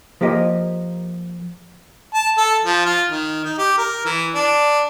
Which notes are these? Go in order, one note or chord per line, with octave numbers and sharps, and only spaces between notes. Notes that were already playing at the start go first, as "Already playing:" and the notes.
F3 A#3 G4 A#4 D#5
A5
A4
F3
F4
D#3
D#4
G4
A#4
E3
D4